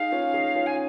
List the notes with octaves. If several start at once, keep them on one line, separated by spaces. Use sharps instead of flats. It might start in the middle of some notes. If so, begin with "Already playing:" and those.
Already playing: D#4 G#4 F5
C#4 F4
D#4 G#4
C#4 F4
G#5